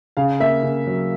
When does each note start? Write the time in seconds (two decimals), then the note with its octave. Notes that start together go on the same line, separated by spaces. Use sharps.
0.17 C#3 F5
0.40 A#3 E5
0.63 C#3
0.87 F#3